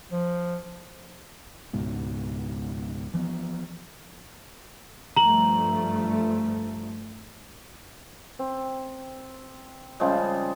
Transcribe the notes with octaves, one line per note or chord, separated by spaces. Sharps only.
F3
C#2 G#2 B2
E3 F3 B3
G2 F3 A3 A#5 F#7
C4
C#3 F3 G3 G#3